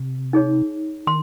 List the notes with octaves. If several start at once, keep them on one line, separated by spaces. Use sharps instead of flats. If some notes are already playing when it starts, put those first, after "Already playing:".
Already playing: C3
D#4 G#4 C#5
D#3 C6